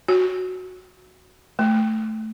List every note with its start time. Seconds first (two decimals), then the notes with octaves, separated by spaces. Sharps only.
0.08 F#4
1.59 A3